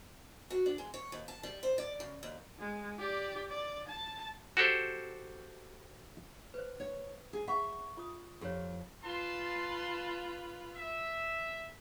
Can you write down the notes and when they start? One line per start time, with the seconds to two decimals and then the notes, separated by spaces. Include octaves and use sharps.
0.50 F#4
0.66 D4
0.78 G#3
0.94 C#5
1.12 D#2
1.28 A5
1.43 G3
1.63 C5
1.78 D5
2.00 C#3
2.23 D#2
2.59 G#3
2.99 G4 D5
3.49 D5
3.88 A5
4.57 F#4 G4 A4 C5
6.54 B4 C5
6.80 C#5
7.33 G#4
7.48 E5 F#5 B5 C#6
7.97 F4 D#6
8.41 F2 G4 C#5
9.03 F4 B4 A5 C6
10.74 E5